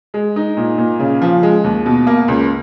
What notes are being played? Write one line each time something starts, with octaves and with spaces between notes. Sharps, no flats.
G#3
D#4
A#2
A#2
C#3
F3
G#3
D#2
B2
A#3
C#2